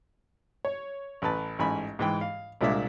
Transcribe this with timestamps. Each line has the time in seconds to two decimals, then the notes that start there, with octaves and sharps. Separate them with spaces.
0.65 C#5
1.22 A1 B4 A5
1.59 A1 G#2 G#5 B5
1.99 G#2 E3 G5
2.21 F5
2.61 C2 A#2 G#3 D4 E5